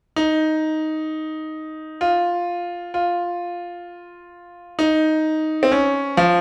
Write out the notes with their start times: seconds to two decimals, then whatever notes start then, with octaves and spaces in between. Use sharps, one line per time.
0.16 D#4
2.01 F4
2.94 F4
4.79 D#4
5.63 C4
5.72 C#4
6.17 F3